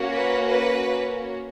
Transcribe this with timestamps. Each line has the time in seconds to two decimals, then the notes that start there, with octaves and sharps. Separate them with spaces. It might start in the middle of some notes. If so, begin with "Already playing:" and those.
Already playing: A#3 C#4 F#4
0.13 B4
0.48 B4